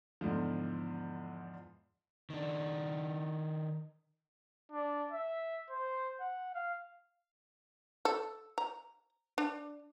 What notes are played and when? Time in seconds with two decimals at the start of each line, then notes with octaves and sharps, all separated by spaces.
0.21 E2 G#2 D3 F3
2.30 D#3 D4
4.72 D4
5.11 E5
5.70 C5
6.20 F#5
6.55 F5
8.05 A4
8.58 A#5
9.38 D4